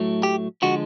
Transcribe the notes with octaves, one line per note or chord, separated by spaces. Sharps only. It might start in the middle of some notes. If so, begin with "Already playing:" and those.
Already playing: A2 F#3 A3
G4
D3 F3 G#3 F#4